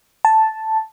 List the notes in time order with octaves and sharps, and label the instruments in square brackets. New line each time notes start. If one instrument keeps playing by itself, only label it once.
[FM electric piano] A5